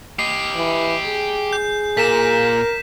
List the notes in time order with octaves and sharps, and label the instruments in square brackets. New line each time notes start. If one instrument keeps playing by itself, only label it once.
[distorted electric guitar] G4 D#5 [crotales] C7
[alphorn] E3
G#4
[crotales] G6
[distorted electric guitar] A#2 [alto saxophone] A#4 [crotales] B6 E7